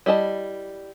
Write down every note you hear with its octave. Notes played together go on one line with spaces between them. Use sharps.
G3 E4 D#5 A5